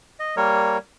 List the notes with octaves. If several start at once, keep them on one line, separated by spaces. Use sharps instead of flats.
D#5
G3 A#3 A#4 C#5